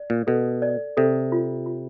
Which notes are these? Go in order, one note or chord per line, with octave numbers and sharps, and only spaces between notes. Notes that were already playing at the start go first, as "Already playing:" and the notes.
Already playing: D5
A#2
B2 A4
D5
C3 A4
F4
F4